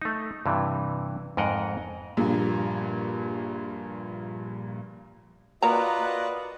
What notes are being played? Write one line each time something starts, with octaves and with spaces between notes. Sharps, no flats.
A3 D#4
G2 C3 E3
F2 G#2 A#4 D#5 F#5
A#1 G2 A#2
A#3 F4 F#4 A#4 B4 D5 D#5 A#5